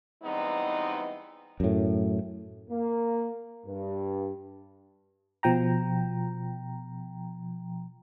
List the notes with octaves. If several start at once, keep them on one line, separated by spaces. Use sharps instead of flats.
E3 G3 G#3 B3 C4 D#4
F#2 A2
A#3
G2
B2 F3 G5 A#5